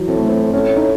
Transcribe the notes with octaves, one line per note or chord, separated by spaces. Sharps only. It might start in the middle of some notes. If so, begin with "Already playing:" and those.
Already playing: E3 F#3
A2 C4
A3
C4
A2 C#4
D#4